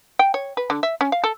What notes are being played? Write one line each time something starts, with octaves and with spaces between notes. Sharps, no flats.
G5
C#5
B4
D3
E5
C#4
F5
A4